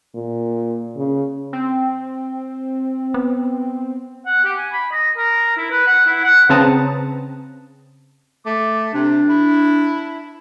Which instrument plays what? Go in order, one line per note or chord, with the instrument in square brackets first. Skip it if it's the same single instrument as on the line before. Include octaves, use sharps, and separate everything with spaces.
[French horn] A#2
C#3
[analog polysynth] C4
[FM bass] B3
[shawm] F#5
G4
G#5
B5
D#5
A#4
E4
B4
F#5
E4
F#5
[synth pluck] C#3 C4 B4 A5 A#5 D#6
[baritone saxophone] A3 [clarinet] D6
[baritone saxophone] C3 [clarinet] D4
[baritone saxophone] E4